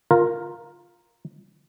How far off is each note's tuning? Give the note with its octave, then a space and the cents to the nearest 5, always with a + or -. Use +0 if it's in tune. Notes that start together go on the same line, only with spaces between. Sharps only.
F4 +5 A#4 +0